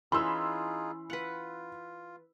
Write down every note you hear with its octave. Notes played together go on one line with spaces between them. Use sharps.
E3 C#4 D#4 F4 G#4 B5 C6 E6
F4 B4 F#5